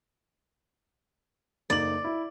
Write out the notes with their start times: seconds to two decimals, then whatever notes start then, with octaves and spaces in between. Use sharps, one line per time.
1.70 F#1 D#4 D5 F#7
2.04 E4